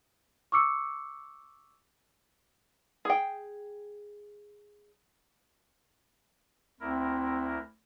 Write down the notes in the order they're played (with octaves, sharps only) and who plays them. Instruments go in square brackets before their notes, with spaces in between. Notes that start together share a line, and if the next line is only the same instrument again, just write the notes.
[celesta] C#6 D6 E6 C#7
[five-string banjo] G#4 G5
[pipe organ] D2 E4 A#4 [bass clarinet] C4